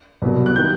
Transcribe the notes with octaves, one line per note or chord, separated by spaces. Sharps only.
C2 B2 F#3 B3
F#6
D#3 G3 G6